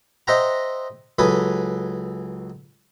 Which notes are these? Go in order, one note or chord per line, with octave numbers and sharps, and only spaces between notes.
C5 D#5 E5 F#5 G5 A#5
C#2 F#3 A4 B4 G#5 D#6